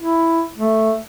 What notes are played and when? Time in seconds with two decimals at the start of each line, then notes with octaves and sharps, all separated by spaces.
0.01 E4
0.58 A3